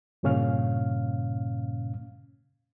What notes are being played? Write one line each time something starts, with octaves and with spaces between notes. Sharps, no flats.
G2 A#2 C#3 C#4 F5 F6